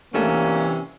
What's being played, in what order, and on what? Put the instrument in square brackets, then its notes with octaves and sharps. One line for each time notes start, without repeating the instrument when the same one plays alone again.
[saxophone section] C3 C#4 [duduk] E3 [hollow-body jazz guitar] G3 A3 D4 [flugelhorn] A#3